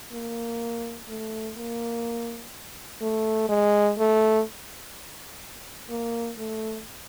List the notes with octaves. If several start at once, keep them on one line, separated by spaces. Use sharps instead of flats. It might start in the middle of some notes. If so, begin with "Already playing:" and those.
A#3
A3
A#3
A3
G#3
A3
A#3
A3